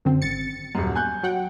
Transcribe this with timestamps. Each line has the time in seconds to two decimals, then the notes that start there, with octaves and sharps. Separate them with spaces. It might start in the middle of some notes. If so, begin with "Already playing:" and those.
0.05 F#2 D3 C4
0.22 G#1 A6 C#7
0.75 D#1 F#2
0.95 G#5 F#6 G6
1.23 F#3 F#5 G5